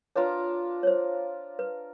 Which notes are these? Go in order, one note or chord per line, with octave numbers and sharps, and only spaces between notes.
D4 F4 A#4 B4 C#5
C#5
C5
B4